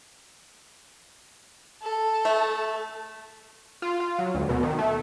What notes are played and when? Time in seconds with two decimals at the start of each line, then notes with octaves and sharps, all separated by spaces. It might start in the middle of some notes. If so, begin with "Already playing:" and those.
1.82 A4
2.25 A3
3.82 F4
4.00 F4
4.19 F#3
4.34 D2
4.49 B2
4.63 D#3
4.78 A3